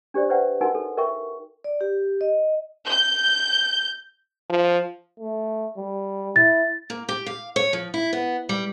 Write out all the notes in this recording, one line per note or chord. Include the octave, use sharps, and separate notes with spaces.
D4 G4 C5 D5
B4 C5 D5 E5 F#5 G5
D#4 F#4 A#4 F#5 G#5 C6
A4
A#4 E5 G5 C#6
D5
G4
D#5
G6
F3
A3
G3
E4 A6
A#3
G4
F5
C#5
F3
E4
B3
G3